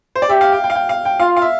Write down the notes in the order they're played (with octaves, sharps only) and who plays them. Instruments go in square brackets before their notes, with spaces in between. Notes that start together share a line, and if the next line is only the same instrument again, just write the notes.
[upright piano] C5
D5
[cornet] G4 [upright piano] E5
[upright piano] F5
G5
G5
F5
G5
F5
G5
[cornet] F4 [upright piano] F5
[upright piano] F5
E5